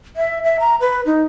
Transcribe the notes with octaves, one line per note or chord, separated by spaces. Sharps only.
E5
E5
A#5
B4
D#4